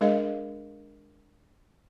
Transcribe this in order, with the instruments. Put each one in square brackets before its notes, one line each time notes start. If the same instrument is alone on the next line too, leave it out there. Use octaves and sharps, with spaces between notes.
[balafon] G#3 D4 G#4 A#4 D#5 F5